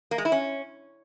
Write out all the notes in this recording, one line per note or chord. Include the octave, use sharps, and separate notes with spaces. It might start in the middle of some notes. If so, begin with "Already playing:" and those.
A#3
G#3
E4
C#4